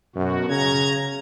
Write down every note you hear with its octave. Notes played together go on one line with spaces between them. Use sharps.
F#2 B2 F#4
C#3 A#5 G#6